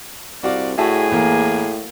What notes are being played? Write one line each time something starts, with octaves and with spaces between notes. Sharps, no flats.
C2 F#4 D5 F5 D6
A2 F#4 G#4 E5 G#5 A5
E2 A#3